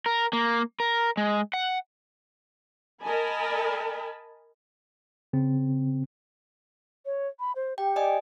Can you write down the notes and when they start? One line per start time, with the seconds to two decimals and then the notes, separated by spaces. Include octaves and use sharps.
0.06 A#4
0.33 A#3
0.80 A#4
1.17 G#3
1.54 F#5
3.01 A#4 D#5 G#5 A5 B5
5.33 C#3 C4
7.06 C#5
7.40 B5
7.56 C5
7.78 G4 G5
7.96 D5 D#5 G#5